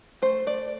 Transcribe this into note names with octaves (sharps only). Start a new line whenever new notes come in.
A3 C5
A3 D5